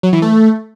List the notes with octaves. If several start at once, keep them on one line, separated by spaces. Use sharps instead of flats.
F#3
E3
A3